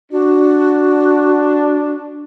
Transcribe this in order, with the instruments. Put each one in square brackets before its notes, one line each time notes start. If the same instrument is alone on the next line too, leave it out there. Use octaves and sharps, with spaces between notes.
[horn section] D4 [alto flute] F#4